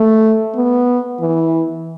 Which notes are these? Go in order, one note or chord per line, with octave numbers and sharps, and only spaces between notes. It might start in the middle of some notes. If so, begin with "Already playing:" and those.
Already playing: A3
B3
E3